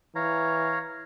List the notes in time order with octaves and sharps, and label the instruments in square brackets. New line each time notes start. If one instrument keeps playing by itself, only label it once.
[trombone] E3 [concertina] C#5 F5 A#5